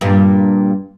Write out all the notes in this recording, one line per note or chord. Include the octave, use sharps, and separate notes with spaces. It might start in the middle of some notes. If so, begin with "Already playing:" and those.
G2 A#2